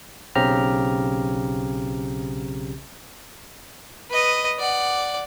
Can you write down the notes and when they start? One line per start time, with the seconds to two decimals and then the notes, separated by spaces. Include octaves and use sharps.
0.35 B1 C#3 C4 G4 A#5 F6
4.10 B4 D#5
4.59 D5 F#5